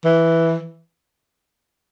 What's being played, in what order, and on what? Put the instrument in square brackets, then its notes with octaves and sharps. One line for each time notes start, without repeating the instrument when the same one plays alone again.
[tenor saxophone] E3